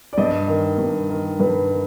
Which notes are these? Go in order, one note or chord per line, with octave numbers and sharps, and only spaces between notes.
D5
G2 D#5
D#3
G2
D#3
G2 B4
D#3